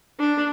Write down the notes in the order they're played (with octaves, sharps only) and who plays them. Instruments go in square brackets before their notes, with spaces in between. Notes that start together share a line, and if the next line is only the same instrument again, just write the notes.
[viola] D4